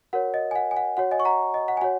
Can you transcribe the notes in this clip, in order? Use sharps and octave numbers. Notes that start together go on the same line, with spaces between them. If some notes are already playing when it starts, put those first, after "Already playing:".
F#4 A#4 C#5 F#5
D#5
G#5
F#5
G#5
F#5
F#4 C#5 F#5
D#5 G#5
C#6
F#5 A#5
D#5
F#5
G#5
F#4 C#5 F#5